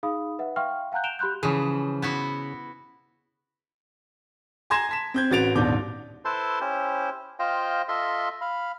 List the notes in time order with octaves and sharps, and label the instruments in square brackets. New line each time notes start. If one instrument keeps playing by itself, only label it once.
[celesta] D#4 G#4 F5 B5 D#6
B4 E5 F#5
E5 F5 G5 C6 C#6 F6
F5 F#5 G#5 A#5 F#6 G6
G6 D7 E7 F7 G7
G4 B5 C6 F#6 G6
[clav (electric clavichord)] C#3 G#4 [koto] E3 F3
[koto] B3 E4 F#4
[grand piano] G#5 A#5 C6 G#6 A#6 E7
A5 B6 E7
C4 G6 G#6
A1 F#4 B4 A6 D7 F7
D#1 G#1 B2 D4 D6 G6
[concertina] E4 A4 B4 C5 A5 C6
C#4 E4 G4 C5
F4 C5 D#5 F5 G5
F4 A4 D#5 E5 C6
F5 B5